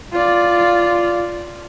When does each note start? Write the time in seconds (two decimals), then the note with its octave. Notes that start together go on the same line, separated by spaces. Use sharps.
0.12 F4 D5